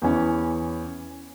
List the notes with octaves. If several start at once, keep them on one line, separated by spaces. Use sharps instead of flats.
E2 E3 C#4